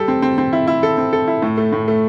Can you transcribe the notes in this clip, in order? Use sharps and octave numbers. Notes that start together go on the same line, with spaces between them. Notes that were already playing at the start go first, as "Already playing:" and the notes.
Already playing: G3 A4
C4
C4
C4
E4
E4
A4
C4
A4
E4
A2
A3
A2
A3